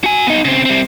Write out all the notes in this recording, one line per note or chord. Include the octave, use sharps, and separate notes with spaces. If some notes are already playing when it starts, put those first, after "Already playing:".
F#4 G#5
B3 D#4
C#3 C4
G3 C4